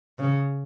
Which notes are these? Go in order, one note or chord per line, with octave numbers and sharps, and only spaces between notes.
C#3